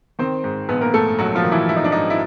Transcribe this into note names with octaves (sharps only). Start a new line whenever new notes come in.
D#3 C4 C5
G#2
A#1 B3 B4
A#3 A#4
G#2 A3 A4
A#1 F#3 F#4
F3 F4
D#3
E3 E4
G#2 E4
D#4
D4
G#2 D#4
E4